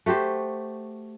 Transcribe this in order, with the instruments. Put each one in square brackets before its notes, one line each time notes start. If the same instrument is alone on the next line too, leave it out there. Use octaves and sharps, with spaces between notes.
[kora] A3 F#4 G4 C5